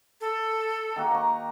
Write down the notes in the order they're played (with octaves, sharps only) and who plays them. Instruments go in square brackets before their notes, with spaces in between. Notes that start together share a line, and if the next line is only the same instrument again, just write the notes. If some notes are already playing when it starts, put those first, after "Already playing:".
[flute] A4
[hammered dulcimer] D#3 A#3 F#4
A#5 C#6